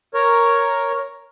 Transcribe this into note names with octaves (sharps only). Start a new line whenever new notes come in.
A#4 C#5